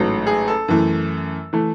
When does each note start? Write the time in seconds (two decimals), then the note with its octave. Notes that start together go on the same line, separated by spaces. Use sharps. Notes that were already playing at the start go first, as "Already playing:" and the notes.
Already playing: A1 G#2 F#3 A3
0.27 G#4
0.48 A4
0.68 F#2 E3 A3
1.53 E3 A3